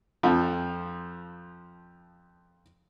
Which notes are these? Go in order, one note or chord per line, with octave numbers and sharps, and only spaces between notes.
F2 F3